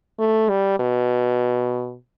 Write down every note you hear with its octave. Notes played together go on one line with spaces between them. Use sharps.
A3
G3
B2